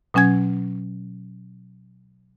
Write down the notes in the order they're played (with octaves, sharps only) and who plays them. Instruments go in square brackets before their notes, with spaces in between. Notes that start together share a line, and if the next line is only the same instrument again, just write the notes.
[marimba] B2 F#3 C#4 G#5 G#6